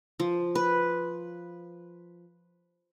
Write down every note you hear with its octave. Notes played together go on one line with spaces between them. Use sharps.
F3
B4